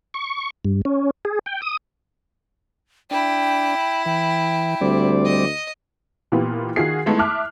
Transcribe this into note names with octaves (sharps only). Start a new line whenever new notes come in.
C#6
G2
C#4
G#4
G5
D#6
D4 E4 G5
E3 G5
D2 G3 C4 D5
D#5
A#2 E3 A#3 B3 G4
D#3 F4 F#4 G#4 C7
G#3 A3 B3 D#4 E4
E5 A5 D6 F6 F#6